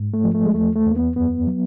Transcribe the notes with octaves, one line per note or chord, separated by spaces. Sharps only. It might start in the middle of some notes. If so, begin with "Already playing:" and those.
Already playing: G#2
A3
F3
A3
G#3
E2 A3
A3
E2
A#3
B3
F#2 B3
F#3